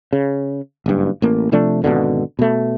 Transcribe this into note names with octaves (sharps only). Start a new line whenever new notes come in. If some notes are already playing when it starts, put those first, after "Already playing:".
C#3
F#1 G2
A1 A#3
C3 F3 A3 D4
G#1 C#2 B2 D3
B2 A3